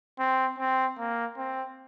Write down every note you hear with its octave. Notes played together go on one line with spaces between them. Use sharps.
C4
C4
A#3
C4